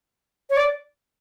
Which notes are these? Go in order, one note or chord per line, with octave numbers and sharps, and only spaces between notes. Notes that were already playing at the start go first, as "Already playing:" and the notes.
C#5
D5